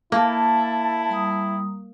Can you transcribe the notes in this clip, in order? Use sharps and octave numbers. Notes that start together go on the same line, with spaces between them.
A#3 E4 A5
G3 A#5 D#6